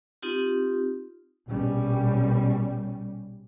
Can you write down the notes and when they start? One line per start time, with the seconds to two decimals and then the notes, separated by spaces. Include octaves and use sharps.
0.22 C4 D#4 F4 G4
1.49 A#1 B2 G3 C#4